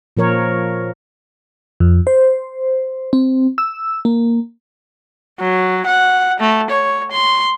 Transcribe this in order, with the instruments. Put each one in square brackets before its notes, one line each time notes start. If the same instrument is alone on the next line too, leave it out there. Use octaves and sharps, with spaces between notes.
[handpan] A#2 F3 A#4 C#5
[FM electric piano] F2
C5
C4
E6
A#3
[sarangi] F#3
F#5
A3
C#5
C6